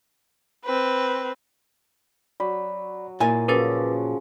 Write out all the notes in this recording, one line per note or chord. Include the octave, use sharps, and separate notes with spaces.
C4 B4
F#3 D5 B5
A#2 E4 A#4 G#5 A6
C#3 F3 F#3 A#4 B4 D6 A6